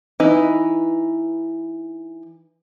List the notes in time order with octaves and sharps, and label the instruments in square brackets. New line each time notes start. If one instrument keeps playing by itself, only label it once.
[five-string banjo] E3 D#4 B4